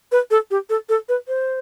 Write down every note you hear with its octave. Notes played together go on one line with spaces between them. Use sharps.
B4
A4
G4
A4
A4
B4
C5